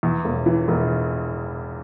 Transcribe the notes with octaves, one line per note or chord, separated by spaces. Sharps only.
E2
E1
E3
E1